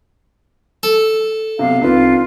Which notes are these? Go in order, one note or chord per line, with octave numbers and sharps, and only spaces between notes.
A4
B1 C3 F5
C2 C4 D4 D#4 F4 B4